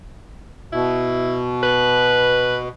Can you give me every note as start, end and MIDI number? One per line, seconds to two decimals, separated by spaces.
0.73 2.69 47
0.73 1.37 64
1.63 2.58 71